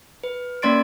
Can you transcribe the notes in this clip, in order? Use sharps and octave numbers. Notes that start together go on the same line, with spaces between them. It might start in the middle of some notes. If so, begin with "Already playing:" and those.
B4
A#3 C#4 D5 C6 A6 D7